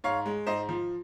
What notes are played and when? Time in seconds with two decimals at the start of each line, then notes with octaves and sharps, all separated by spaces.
0.04 G#2 C#5 F5
0.26 G#3
0.47 G#2 C5 D#5
0.69 F3